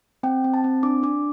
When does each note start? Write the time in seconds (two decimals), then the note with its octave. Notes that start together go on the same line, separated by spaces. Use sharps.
0.23 C4 G5
0.44 C4
0.54 A5
0.64 C4
0.83 D4 D6
1.03 D4 D6